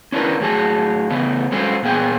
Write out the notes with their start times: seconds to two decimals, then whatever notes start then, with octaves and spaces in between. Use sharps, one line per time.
0.12 C#4 D4 E4 G4 A#4 B4
0.40 A2 F#3 G#4 A5
1.10 C#3 A3 B3
1.52 F#3 G#3 C#4 A4 C5
1.83 A#2 B3 G#4 G5 G#5